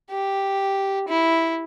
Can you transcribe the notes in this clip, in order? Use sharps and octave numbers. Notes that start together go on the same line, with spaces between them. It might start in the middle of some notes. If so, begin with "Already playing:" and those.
G4
E4